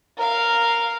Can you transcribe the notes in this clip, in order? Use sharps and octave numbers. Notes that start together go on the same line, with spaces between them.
A#4 F5